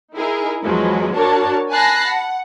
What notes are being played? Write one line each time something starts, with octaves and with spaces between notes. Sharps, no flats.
D#4 E4 G#4 A#4
E2 F3 F#3 G#3 B4
D4 F#4 A#4 C#5 A5
G#5 A5 B5 F#6 A#6 C7
F#5